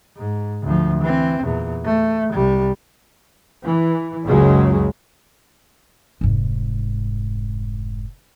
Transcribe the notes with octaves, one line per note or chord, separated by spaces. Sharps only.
G#2
D2 F3
E3 C4
E2 A#2
A3
C2 G3
E3
F#1 C#2 C#3 F#3 G#3
F1 G#2